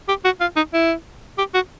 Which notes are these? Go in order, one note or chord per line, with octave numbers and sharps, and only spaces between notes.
G4
F#4
F4
D#4
E4
G4
F#4